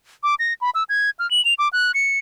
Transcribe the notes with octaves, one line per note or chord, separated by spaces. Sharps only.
D6
A#6
B5
E6
G#6
F6
F#7
F7
D6
F#6
C#7